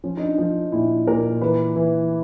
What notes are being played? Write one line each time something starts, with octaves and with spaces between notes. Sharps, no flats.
F3 C#4
D#4
D4
F3 D#4
A#2 E4
A#2 A#4
E3 B4
E3